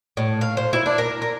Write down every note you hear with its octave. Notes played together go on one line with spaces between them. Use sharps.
A2
F5
C5
E4
D4
A#4
A#4